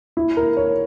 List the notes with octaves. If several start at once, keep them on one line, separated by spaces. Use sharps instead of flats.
E4
A#4
C#5